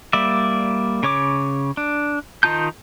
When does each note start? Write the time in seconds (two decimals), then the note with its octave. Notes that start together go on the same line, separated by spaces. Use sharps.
0.13 G3 A#3 D5 E5
1.03 C#3 C#5 D6
1.77 D4
2.43 D#3 D#4 F4 A5 G6